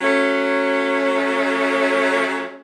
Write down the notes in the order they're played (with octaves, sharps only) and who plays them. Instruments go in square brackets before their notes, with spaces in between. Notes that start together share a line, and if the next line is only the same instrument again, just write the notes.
[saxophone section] F#3 A3 C#4